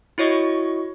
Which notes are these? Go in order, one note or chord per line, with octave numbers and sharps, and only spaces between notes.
E4 F#4 C#5 D#5 C#6